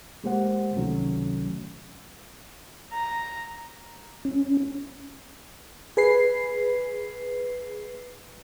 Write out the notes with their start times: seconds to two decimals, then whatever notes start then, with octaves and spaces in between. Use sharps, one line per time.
0.24 G#3 A#3 G4 C5 F#5
0.76 C#2 C3 D#3 F#3 A3 C#4
2.92 A#5
4.25 C#4
5.97 G#4 B4 C7